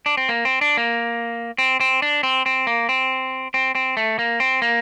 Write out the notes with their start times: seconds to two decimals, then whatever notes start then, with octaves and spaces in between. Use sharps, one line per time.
0.06 D4
0.17 C4
0.29 A#3
0.45 C4
0.61 D4
0.77 A#3
1.58 C4
1.80 C4
2.02 D4
2.23 C4
2.46 C4
2.67 A#3
2.89 C4
3.54 C4
3.75 C4
3.97 A3
4.19 A#3
4.40 C4
4.62 A#3